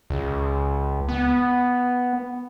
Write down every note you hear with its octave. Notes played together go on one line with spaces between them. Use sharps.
C#2
B3